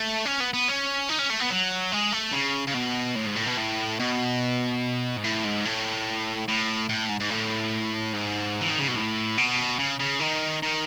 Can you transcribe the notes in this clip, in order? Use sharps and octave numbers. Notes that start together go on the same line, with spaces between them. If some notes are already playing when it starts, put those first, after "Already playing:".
Already playing: A3
C#4
B3
B3
C#4
D#4
C#4
A3
B3
F#3
G#3
A3
C#3
C#3
B2
A2
G#2
A2
B2
A2
B2
G#2
A2
G#2
A2
A2
A2
G#2
G#2
A2
G#2
E3
D#3
C#3
B2
A2
B2
C#3
C#3
D#3
D#3